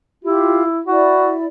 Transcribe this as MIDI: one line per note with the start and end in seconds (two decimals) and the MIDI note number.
0.25 0.81 64
0.25 0.63 65
0.25 0.63 67
0.87 1.46 64
0.87 1.36 66
0.87 1.46 74